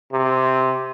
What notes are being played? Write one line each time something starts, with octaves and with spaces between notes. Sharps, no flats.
C3